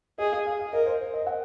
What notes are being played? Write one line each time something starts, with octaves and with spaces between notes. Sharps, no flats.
G#4 D#5
F5
F5
F5
A#4 D#5
C5
C5
D#5
F#5